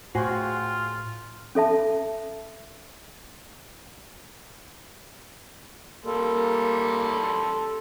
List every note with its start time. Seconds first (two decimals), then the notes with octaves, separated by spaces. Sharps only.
0.15 A2 F4 F#4 G#4 C5 G5
1.55 C#4 A4 E5 A5
6.05 G3 A#3 A4 C6